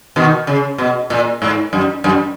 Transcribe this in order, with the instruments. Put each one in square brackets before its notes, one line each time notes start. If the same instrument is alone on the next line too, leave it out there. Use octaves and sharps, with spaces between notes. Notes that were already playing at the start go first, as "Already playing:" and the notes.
[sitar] B2 D#3
C#3
B2
A#2
G#2
F#2
F#2